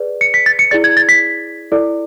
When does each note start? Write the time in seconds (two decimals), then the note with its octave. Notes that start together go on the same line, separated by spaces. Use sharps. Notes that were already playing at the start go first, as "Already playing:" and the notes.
Already playing: G#4 B4 D5
0.21 C#7
0.34 B6
0.46 A6
0.59 C#7
0.71 E4 G#4 D5 A6
0.84 G#6
0.97 A6
1.09 B6
1.72 E4 A4 D5